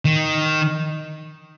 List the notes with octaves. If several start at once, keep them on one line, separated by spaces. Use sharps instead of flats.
D#3